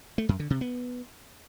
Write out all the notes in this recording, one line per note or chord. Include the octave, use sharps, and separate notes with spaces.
A3
F#2
D3
C3
B3